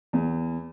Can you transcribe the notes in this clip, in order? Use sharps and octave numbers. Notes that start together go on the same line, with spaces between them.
E2